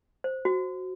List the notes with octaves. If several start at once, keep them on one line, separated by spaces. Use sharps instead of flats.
C5
F#4